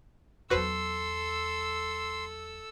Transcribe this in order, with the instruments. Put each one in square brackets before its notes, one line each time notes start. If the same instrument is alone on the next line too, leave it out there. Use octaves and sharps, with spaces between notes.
[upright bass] E2 F#3 [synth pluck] F#4 B4 C5 [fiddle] A4 E6 [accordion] C6